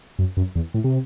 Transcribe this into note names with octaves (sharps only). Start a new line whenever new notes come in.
F#2
F#2
E2
A2
C3